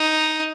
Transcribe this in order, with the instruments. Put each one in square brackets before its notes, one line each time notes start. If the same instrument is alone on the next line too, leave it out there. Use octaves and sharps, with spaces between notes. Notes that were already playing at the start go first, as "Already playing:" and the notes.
Already playing: [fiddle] D#4